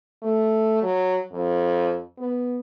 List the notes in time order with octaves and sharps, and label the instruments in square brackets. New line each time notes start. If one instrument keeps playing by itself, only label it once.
[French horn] A3
F#3
F2
B3